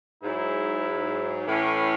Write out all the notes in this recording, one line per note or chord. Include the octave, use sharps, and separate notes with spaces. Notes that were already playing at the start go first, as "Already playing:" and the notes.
G#2 F#3 E4
A2 E3 C#4